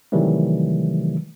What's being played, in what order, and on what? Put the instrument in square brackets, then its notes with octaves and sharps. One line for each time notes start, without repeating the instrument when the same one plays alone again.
[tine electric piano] C3 D#3 E3 F#3 G3 A3